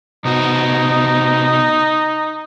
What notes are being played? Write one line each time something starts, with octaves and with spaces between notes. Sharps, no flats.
C3 B3 D#4 F#4